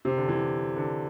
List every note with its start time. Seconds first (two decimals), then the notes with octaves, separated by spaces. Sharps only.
0.05 C3
0.17 D3
0.29 E3
0.76 D3